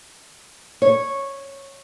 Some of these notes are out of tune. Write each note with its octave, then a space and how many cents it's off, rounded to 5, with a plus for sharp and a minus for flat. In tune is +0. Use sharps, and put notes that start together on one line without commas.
C#5 -10